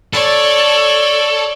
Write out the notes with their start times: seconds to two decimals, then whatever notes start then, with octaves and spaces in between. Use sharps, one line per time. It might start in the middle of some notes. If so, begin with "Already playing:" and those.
0.13 A4 C#5 D5